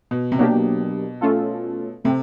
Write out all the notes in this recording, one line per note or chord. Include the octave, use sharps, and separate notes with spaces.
B2
C3
B2 F#3 A#3 D4 G4
A3 C#4 F4 A4
C3 A3 C4